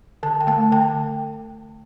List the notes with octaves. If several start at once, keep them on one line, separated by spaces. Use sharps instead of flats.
D3 A5
G5
A3 A5
D3 G5